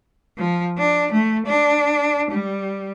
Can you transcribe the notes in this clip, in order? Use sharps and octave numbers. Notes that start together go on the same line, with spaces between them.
F3
D4
A3
D4
G3